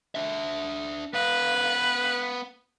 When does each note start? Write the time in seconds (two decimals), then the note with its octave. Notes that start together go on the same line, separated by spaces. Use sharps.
0.15 D4 E5
1.14 B3 B4 F5